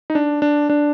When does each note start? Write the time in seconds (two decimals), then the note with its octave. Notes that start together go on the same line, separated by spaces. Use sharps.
0.10 D#4
0.15 D4
0.42 D4
0.70 D4